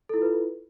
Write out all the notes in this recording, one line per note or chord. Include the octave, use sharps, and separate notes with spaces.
E4 F4 A4 B4